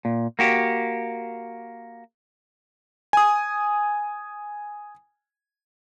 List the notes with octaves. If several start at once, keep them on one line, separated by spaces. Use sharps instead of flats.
A#2
A#3 F#4 G4
G#5 D#6